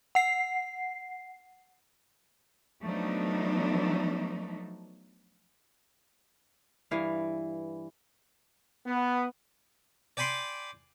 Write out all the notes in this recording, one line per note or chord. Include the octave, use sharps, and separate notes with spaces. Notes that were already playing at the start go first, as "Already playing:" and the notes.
F#5 C7
F3 F#3 A3 B3 D4 D#4
G2 E3 F5
B3
D5 G5 G#5 B5 C6 D6